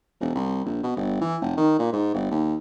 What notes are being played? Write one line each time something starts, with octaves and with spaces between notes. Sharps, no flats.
E1
C2
A#1
B2
G1
E3
F1
D#3
A#2
G#2
G1
D#2